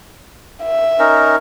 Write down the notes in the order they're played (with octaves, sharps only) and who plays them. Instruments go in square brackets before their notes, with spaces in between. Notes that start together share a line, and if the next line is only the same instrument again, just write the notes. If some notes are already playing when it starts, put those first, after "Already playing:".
[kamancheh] E5
[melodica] C#4 D#4 A#4